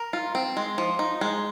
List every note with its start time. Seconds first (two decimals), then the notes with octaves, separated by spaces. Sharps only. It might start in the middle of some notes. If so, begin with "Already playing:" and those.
Already playing: A#4
0.13 F4
0.35 C4
0.57 G#3
0.78 F3
0.99 D#4
1.21 G#3